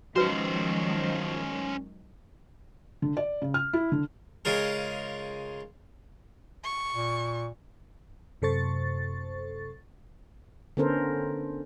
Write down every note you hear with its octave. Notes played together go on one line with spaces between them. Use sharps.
D#3 F3 F#3 G#3 C#4 F#4 B4 C5
D3
D5
C#3
F6
E4
D3
C#3 G#3 F4 A#4
C#6
A#2
F#2 C3 A4 C5 C#6 A6
D3 B3 C#4 A4 A#4 C5